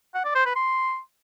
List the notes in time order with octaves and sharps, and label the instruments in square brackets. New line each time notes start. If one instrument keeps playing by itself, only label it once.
[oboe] F#5
D5
C5
B4
C6